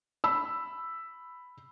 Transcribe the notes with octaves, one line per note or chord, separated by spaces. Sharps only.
B5 E6